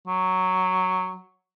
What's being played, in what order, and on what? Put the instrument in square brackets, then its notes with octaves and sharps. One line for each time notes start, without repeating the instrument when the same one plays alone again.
[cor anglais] F#3